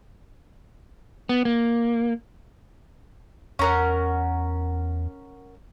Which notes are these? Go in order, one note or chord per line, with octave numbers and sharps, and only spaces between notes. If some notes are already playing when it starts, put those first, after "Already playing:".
B3
A#3
E2 C#4 A#4 F#5